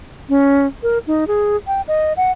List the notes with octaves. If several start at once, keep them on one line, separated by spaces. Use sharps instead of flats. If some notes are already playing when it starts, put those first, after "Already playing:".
C#4
A#4
D#4
G#4
G5
D#5
F#5